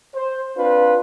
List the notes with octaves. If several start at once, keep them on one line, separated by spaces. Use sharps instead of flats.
C5
C4 D4 F4 B4